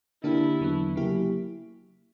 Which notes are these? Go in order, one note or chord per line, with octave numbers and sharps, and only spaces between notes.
D3 A#3 D4 E4 G4
E2 D3 F#3 B3
C#3 F#3 A#3 E4 G4